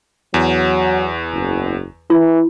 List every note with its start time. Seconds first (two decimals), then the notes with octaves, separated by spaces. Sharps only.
0.34 E2 F#3
1.33 F#1
2.10 E3 E4